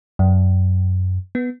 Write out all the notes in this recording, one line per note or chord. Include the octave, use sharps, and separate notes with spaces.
F#2
B3